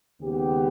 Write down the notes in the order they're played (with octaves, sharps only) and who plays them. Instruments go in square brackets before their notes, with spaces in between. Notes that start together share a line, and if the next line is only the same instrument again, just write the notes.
[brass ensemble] D#2 C#3 G#3 B3 G4